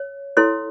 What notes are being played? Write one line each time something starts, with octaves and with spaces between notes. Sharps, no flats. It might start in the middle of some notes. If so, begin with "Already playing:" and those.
Already playing: C#5
E4 A4 C#5 C6